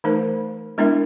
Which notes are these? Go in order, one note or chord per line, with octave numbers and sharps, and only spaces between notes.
E3 A3 D#4 A#4 C5
G#3 B3 D4 E4 A#4 E5